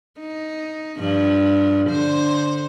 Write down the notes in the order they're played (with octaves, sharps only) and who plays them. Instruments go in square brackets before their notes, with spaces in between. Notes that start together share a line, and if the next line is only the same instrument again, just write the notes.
[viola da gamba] D#4
G2 F3
D3 C5